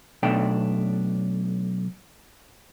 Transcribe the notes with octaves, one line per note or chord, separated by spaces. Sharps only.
B1 B2 A3 D4 G5